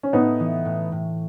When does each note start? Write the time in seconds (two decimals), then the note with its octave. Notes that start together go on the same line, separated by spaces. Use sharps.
0.03 C#4
0.13 A2 B3 D#4
0.40 E3
0.65 A2
0.92 A2